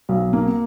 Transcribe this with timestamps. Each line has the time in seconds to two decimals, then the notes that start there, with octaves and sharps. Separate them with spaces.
0.09 B1
0.33 A#3